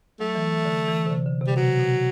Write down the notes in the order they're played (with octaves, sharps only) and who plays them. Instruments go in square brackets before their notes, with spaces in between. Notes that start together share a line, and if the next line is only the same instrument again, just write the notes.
[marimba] F#3 [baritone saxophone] A3
[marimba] E3
D3
E3
C3
D3
D3
C3
[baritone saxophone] G3
[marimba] B2 [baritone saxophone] F#3
[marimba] B2